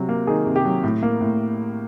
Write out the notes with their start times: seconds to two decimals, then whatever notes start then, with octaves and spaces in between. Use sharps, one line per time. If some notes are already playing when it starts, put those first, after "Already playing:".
Already playing: C3 F#3
0.09 A#3
0.27 D#3 G#4
0.47 C3
0.56 G4
0.65 F#3
0.84 A2
1.03 A#3
1.21 A2